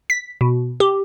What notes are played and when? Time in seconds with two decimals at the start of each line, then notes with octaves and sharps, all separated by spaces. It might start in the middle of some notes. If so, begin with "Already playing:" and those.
0.10 B6
0.41 B2
0.80 G4